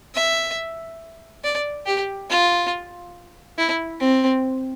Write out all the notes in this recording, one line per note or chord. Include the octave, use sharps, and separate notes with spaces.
E5
D5
G4
F4
E4
C4